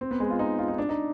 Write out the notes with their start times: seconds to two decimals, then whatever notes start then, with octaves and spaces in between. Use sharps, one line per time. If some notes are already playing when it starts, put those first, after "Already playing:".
0.01 C4
0.11 B3
0.20 G#3
0.30 F4
0.39 D#4
0.59 F4
0.68 D#4
0.78 D4
0.89 D#4